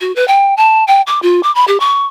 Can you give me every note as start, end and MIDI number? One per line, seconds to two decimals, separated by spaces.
0.01 0.14 66
0.16 0.26 71
0.28 0.54 79
0.57 0.84 81
0.87 1.02 79
1.07 1.20 86
1.22 1.41 65
1.43 1.53 86
1.55 1.65 83
1.68 1.78 67
1.80 2.07 85